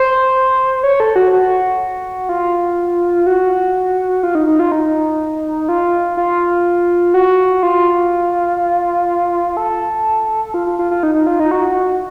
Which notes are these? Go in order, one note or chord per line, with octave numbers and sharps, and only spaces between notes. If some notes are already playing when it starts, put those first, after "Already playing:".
Already playing: C5
C#5
A4
F#4
F#4
F4
F#4
F4
D#4
D#4
F4
D#4
F4
F4
F#4
F4
A4
F4
F4
F4
F4
D#4
D#4
F4
D#4
F#4